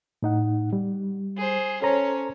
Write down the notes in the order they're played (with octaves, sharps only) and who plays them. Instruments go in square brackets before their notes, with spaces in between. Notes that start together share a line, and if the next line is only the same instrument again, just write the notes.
[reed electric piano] A2 D#4 F#5
G3
[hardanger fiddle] G#4 C5
[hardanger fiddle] C#4 C#5 [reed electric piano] A4 C5 A#5